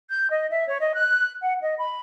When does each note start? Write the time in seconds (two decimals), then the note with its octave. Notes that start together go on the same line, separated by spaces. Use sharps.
0.10 G6
0.30 D#5
0.51 E5
0.67 C#5
0.81 D#5
0.97 F#6
1.41 F#5
1.61 D#5
1.78 B5